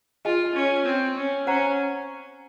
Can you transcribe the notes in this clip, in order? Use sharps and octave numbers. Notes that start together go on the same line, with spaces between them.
F4 G#4 D#5 G#5
C#4
C4
C#4
C#4 C5 F#5 A#5